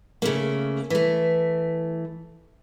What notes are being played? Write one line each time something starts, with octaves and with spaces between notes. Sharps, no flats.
C#3 A3 A#3
E3 A3